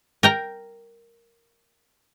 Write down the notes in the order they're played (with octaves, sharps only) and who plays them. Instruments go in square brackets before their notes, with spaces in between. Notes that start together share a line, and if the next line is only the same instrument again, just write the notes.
[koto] A#4 G5 A#5